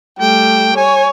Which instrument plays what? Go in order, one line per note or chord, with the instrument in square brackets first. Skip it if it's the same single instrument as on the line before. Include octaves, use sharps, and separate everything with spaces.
[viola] G3 A3 [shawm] G5
[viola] C#5 [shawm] G#5